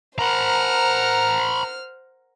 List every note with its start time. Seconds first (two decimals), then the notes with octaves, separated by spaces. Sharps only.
0.19 A#4 C5 F#5 A#5 B5 F6